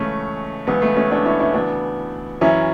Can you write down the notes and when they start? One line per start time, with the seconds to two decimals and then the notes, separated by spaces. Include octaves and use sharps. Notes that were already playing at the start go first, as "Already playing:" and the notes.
Already playing: C#2 C#3 E3 A3 C#4
0.67 C#2 C#3 E3 B3
0.82 A3
0.96 A3 C#4
1.11 B3 D4
1.25 C#4 E4
1.40 C#4 E4
1.54 D2 C#3 E3 B3 D4
2.41 F#2 E3 C#4 E4